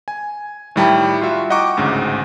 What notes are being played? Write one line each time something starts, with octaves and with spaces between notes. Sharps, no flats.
G#5
A2 D#3 G3 E4 G5 A5
F4 F#4 E5
D#5 F#5 G5 A#5 C#6 D6
A1 D2 G#2 C#3